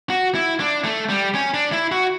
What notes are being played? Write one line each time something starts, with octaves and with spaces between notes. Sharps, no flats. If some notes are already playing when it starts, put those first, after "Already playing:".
F#4
E4
D4
A3
G3
C#4
D4
E4
F#4